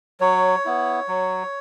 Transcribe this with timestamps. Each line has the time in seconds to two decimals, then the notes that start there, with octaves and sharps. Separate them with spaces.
0.20 F#3 C#5
0.65 B3 E4
1.08 F#3